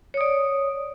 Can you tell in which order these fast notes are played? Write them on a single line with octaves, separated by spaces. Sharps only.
C#5 D#6 D5